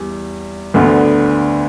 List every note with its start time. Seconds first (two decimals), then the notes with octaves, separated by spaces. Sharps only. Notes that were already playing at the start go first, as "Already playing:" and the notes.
Already playing: E2 G3
0.74 D2 D3 B3